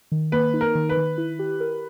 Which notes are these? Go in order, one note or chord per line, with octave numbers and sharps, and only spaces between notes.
D#3
A#3 B4
D#4
A#4
D#3
B4
D#3
E4
G4
A#4